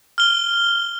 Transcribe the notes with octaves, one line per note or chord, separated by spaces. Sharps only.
F6 G7